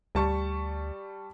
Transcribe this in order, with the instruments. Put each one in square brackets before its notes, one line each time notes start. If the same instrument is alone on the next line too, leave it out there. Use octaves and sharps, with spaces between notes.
[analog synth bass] D2 [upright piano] G3 A5 C#6